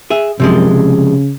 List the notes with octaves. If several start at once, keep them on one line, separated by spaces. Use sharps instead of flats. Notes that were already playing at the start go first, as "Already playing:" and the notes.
G#4 E5
F#2 C3 F3 G#3
C#3